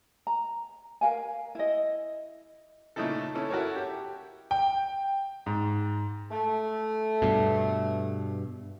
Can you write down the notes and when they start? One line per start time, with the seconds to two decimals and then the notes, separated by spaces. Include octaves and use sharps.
0.27 A#5
1.01 A#4 F5 G#5
1.55 E4 D#5
2.96 A#2 C#3 A3 D#4 E4 A4
3.35 C#4 E4 A4
3.50 E4 F#4 A4 A#4 C#5
3.75 G4 G5
4.51 G5
5.46 G#2
6.31 A3
7.22 G2 B2